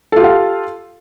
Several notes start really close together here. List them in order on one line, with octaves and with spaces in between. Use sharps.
A4 F4 G4 F5